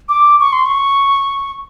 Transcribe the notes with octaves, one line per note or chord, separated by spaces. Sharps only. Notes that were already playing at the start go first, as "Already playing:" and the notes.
D6
C#6
C6
C#6